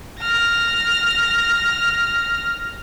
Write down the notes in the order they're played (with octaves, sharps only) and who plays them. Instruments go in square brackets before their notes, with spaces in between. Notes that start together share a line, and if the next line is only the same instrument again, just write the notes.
[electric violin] F6 A#6